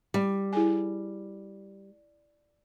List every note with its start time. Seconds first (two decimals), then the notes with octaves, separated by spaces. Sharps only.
0.14 G3
0.53 E4 G#4 G#5